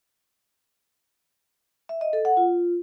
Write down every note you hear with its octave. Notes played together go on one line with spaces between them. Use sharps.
E5
D#5
A4
F#5
F4